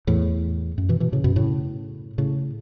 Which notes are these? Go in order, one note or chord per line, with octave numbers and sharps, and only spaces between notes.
E2 A2
F#2
B2 E3
B2 E3
A2 C#3
F#2 B2
A2 C#3
A2 C#3